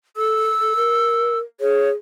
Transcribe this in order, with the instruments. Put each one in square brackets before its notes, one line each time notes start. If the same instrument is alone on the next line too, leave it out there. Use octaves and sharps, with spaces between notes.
[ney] A4 [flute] E6
[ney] A4
A#4
[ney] G#4 [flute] C#5